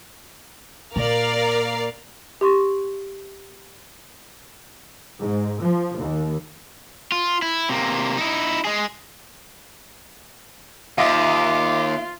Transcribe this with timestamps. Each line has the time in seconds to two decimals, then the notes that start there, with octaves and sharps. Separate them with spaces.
0.96 A#2 A#4 D5 F5
2.41 G4 C6 C#6
5.18 G#2
5.61 F3
5.98 D#2
7.12 F4
7.42 E4
7.70 C3 A#3
8.17 D#4 E4
8.65 G#3 G#4
10.98 D#2 F4 D#5 E5 D6